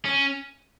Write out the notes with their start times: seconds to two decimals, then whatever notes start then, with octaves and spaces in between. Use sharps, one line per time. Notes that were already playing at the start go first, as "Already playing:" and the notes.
0.05 C#4